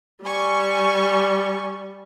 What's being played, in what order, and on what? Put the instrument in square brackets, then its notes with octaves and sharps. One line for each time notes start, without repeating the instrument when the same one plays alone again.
[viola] G3 [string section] G#5 C#6